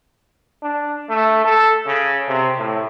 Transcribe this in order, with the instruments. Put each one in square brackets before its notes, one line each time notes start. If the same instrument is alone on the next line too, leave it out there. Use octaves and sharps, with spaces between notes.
[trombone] D4
A3
A4
C#3
C3
A2